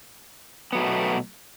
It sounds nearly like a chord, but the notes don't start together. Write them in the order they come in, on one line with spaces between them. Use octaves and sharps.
B3 F#3 A3 B2